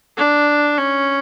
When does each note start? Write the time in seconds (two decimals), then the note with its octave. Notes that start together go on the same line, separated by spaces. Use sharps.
0.17 D4
0.78 C#4